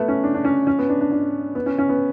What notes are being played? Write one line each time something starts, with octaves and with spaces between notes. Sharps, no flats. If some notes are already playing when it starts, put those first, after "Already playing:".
Already playing: A3 B3
C#4
D4
D4
C#4
C#4
B3
D4
D4
D4
B3
C#4
C#4
B3